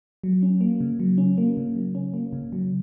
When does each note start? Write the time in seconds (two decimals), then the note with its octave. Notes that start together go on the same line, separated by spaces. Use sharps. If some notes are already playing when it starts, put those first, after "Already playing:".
0.24 F#3
0.43 C#4
0.61 A#3
0.80 C#3
1.00 F#3
1.18 C#4
1.38 A#3
1.57 C#3
1.76 F#3
1.95 C#4
2.14 A#3
2.33 C#3
2.52 F#3